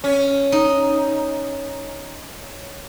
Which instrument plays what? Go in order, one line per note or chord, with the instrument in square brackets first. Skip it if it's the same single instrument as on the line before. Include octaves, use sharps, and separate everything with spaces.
[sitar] C#4
[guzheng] D#4